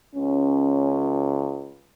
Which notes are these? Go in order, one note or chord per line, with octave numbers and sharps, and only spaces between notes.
C#2 C#4